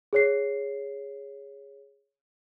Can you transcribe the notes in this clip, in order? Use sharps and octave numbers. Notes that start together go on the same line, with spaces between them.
G#4 C#5 C7